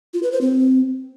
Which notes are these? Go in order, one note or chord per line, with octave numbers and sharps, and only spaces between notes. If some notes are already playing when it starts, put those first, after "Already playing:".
F4
B4
C5
C4